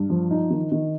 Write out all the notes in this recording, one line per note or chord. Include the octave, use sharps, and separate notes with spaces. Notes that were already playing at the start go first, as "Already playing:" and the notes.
Already playing: G2
F3
D#4
D#3
D#3